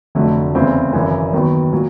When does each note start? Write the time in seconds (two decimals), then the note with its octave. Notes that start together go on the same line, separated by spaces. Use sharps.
0.15 F1 F2 D3 F#3 A3
0.55 E2 C#3 E3 A3 C4
0.93 G#1 F#2 C#3 E3
1.33 D#2 D#3 F#3 B3
1.72 A#2 F#3